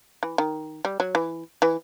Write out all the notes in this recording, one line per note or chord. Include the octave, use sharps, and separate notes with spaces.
E3
D#3
G3
F#3
E3
E3